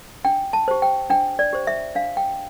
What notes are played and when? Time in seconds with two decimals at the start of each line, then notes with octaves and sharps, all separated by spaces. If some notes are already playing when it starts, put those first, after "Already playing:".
0.25 D4 G5
0.53 A5
0.68 G4 C5
0.82 G5
1.10 D4 G5
1.39 D5
1.53 G4 C5
1.67 E5
1.95 D4 F5
2.17 G5